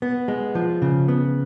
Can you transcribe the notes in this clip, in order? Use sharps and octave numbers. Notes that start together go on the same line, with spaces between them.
B3
G#3
F3
C#3
B3